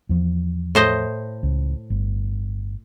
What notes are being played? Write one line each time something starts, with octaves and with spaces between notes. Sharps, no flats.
E2 F3
A2 C5 D#5
C#2
G1